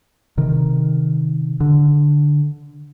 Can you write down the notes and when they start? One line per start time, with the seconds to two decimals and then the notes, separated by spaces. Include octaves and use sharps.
0.37 C3 D#3
1.60 D3